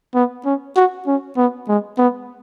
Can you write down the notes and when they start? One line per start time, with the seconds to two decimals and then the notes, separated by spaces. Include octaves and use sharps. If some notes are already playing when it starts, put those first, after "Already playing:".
0.15 B3
0.45 C#4
0.76 F#4
1.07 C#4
1.37 B3
1.68 G#3
1.98 B3